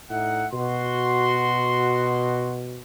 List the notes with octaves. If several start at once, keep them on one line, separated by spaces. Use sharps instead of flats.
A2 D#4 E5 F#5
B2 F#4 C6